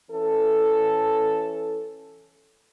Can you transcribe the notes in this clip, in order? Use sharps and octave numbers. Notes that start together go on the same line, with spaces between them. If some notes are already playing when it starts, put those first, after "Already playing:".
E3 C#4 A4